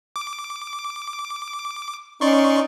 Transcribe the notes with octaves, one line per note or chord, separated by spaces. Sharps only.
D6
C#4 D#4 D5 C6 C#6